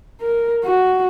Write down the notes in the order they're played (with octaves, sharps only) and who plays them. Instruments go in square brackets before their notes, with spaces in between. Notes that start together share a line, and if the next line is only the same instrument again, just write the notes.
[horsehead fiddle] A#4
F#4